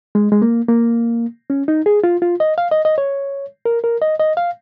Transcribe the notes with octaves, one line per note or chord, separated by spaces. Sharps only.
G#3
G#3
A#3
A#3
C#4
D#4
G#4
F4
F4
D#5
F5
D#5
D#5
C#5
A#4
A#4
D#5
D#5
F5